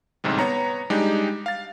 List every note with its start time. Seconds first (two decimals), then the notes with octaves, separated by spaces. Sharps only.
0.24 A1 D2 G#2 C3 G3
0.39 B3 C#5 A#5
0.90 G3 G#3 D4 D#4 G4
1.46 F5 A6